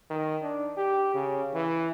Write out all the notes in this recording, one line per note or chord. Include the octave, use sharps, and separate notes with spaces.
D#3
D4
G4
C#3
E3